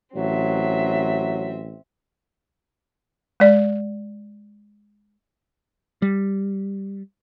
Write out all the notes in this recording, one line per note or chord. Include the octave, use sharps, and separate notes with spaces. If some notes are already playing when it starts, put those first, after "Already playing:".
A1 F#3 C4 E5
G#3 D5
G3